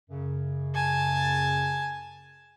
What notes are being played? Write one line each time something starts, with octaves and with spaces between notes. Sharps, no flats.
F#2 C#3
G#5 A5